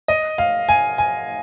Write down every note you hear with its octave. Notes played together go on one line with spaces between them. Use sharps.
D#5
F5
G#5
G#5